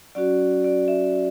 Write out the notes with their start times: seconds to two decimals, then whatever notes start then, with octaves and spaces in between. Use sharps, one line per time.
0.15 F#3 C#4 F#4 D5
0.64 D5
0.88 E5